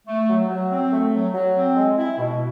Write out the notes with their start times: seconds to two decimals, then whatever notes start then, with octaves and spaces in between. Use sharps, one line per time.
0.07 A3
0.29 F#3
0.49 F#3
0.71 C4
0.92 A3
1.13 F#3
1.34 F#3
1.56 C4
1.76 G#3
1.98 E4
2.18 B2